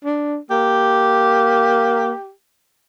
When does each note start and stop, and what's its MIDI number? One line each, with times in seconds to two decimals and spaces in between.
0.04 0.37 62
0.50 2.12 58
0.50 2.31 67